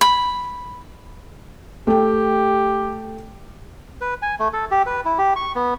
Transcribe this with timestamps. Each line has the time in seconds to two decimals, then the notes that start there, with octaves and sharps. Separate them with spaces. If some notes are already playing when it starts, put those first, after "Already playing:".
0.01 B5
1.87 A3 G4 G5
4.01 B4
4.22 G#5
4.39 A3
4.53 A4
4.71 G4
4.86 B4
5.05 E4
5.18 G4
5.36 C#6
5.55 B3